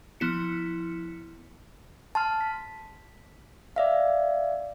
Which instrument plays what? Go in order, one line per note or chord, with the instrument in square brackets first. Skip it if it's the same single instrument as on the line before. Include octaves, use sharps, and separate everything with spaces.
[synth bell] F3 B3 E4 C#7
[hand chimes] A5 C6 F6
B6
D5 E5 F5